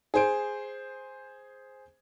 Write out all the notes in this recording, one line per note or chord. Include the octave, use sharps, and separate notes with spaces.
G#4 C5 D7